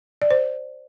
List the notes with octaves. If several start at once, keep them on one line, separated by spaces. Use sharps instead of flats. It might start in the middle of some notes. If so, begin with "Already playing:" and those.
D5
C5